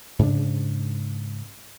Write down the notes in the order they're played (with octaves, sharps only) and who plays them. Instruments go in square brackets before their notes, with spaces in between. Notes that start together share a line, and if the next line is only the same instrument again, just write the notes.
[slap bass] G#2 C#3 D4